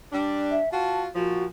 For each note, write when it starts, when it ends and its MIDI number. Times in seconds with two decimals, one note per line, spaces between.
0.13 0.58 55
0.13 0.58 62
0.51 0.72 76
0.72 1.07 65
0.72 1.07 66
0.72 0.98 81
1.15 1.45 46
1.15 1.45 53
1.15 1.44 66